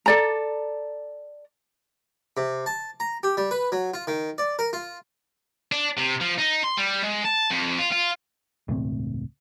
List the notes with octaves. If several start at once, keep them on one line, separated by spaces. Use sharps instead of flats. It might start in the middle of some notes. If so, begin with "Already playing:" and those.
A4 D5 A#5
C3
A5
A#5
G4
G3
B4
F#3
F4
D#3
D5
A#4
F4
D4
C3
F3
D#4
C6
G3
G#3
A5
F2
F4
F4
E1 C#2 A2 C4